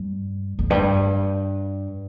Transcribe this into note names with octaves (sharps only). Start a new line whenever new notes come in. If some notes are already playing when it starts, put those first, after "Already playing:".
Already playing: G2
F2
G2